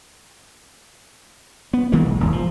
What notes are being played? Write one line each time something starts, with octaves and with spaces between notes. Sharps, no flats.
B3
D#3 E3 G#3 A#3
B1
D#1 G#1 D#2
F3